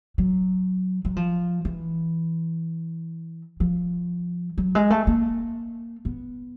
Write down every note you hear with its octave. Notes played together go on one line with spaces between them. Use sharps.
F#3
F#3
F3
E3
F3
F#3
G#3
A3
A#3
B3